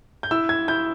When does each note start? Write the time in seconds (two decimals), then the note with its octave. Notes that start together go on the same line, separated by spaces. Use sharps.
0.23 G6
0.31 E4 E6
0.49 G#6
0.68 E4 G6